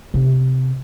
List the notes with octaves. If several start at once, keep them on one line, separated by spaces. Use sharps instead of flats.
C3